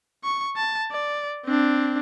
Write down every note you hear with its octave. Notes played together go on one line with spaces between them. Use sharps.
C#6
A5
D5
C4 D4